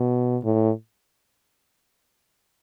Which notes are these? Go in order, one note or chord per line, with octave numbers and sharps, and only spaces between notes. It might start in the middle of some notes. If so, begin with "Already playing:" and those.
Already playing: B2
A2